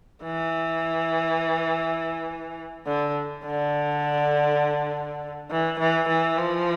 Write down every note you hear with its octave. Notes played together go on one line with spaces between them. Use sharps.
E3
D3
D3
E3
E3
E3
F3